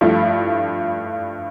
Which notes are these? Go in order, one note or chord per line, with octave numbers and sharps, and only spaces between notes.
G2 F3 A3 E4